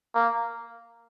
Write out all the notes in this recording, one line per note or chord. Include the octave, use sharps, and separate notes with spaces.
A#3